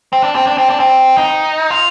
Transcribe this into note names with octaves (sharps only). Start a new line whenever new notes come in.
C4
D4
C4
D4
C4
D4
C4
D#4
F4